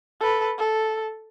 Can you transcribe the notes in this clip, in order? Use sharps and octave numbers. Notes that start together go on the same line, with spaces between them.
A4 B4
A4